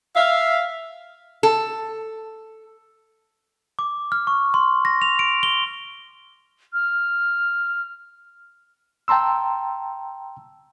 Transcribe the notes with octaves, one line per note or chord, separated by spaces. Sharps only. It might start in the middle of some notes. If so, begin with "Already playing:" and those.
E5 F5
A4
D6
F6
C#6
C6
A#6
F7
D7
G7
F6
G5 A5 A#5 C6 E6